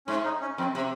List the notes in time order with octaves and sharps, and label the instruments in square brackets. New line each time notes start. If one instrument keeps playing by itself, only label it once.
[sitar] G#2 [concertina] C#4
[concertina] D#4
C#4
[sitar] F2 [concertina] C4
[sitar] C3